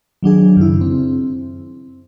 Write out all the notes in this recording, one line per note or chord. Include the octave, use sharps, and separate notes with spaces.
D#3 F#3 D4 G#4
F#2 C#3 E4
C4